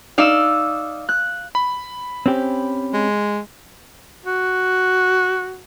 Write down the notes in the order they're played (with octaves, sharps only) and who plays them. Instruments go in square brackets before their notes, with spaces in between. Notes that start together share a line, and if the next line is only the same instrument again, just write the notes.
[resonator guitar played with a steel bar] D#4 D5 [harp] F5 E6
[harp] F#6
[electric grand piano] B5
[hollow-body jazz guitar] C4 C#4 G4
[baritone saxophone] G#3
[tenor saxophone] F#4